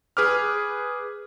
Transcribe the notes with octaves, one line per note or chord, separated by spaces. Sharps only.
G#4 B4 D6 F6